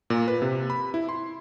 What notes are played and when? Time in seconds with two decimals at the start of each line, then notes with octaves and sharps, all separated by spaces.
0.10 A#2
0.28 B4
0.42 C3
0.70 B5
0.94 E4
1.09 C6